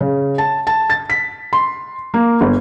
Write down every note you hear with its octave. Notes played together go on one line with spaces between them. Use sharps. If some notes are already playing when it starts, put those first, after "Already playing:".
C#3
A5
A5
A6
B6
C6
A#3
G1